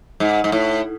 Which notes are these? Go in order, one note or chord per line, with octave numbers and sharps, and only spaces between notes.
G#2
G#2
A2